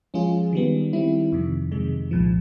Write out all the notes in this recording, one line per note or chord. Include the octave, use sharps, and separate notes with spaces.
F3 G#3 C#4 F4 G#4
D#3 G3 B3
D#3 G3 C4 E4
F2 C3 D#3
F2 C3 D#3 G#3
C2 A#2 F3